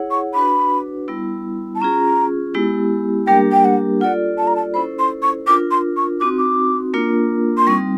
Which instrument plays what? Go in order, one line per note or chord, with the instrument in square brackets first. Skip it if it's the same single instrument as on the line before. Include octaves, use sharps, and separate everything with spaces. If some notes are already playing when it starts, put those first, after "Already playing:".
Already playing: [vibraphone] E4 G#4 C#5 F#5
[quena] C#6
[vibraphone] D4 F#4 B4 [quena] B5
[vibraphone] G3 B3 E4
[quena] A5
[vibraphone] C#4 F4 G#4 [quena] A#5
[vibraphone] G#3 B3 E4 G4
[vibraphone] G3 A#3 D4 G4 A#4 [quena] G5
[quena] G5
F#5
[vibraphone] F4 A4 D5 [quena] F#5
[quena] A5
A#5
A5
[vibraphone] C#4 E4 A4 C5 [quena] B5
[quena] C6
C#6
[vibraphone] D4 F4 A#4 [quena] D6
[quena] C6
C#6
[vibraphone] C4 D#4 F#4 [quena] D6
[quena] D6
[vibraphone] A#3 D4 F4 A#4
[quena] C6
[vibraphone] G3 C4 D#4 [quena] C#6